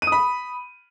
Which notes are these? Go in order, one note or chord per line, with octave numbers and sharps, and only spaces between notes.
B5 D#6 D#7